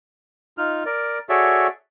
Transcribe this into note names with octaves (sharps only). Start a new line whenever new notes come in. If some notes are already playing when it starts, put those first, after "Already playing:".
D#4 F4 F6
A#4 D5
F#4 G#4 A4 C#5 D5 E5